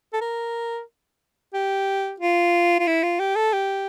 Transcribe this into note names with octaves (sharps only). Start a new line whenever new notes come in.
A4
A#4
G4
F4
F4
E4
F4
G4
A4
G4